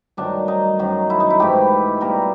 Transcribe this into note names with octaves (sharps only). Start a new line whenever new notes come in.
G2 D#3 F#3 A3 D4
D#4
F#2 D#3 F#3
E4
D#4
E4
G#2 E3 A3 G4
B2 G3 A#3 A#4